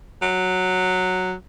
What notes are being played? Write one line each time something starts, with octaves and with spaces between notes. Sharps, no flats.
F#3